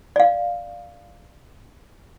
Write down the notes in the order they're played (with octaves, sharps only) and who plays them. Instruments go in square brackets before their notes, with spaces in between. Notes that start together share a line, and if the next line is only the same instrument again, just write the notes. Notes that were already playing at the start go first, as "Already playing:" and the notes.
[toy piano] D5 F5